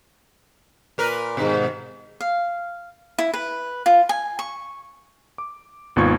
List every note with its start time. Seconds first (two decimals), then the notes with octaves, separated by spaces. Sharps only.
0.98 A#2 A#4 B4
1.37 G#2 B2 D#3
2.20 F5
3.18 E4
3.34 B4
3.86 F4
4.09 G#5
4.39 C#6
5.38 D6
5.96 G#1 D#2 B3 F4 C#6 G#6